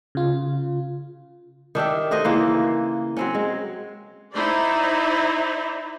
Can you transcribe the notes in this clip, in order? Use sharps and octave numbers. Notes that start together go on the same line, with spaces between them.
C#3 F4
D#3 D4 G4 E5
A3 F#4 C5 D#5
C#3 E3 A#3 F4
F#3 C4 C#4
G#3
D#4 E4 C5 D5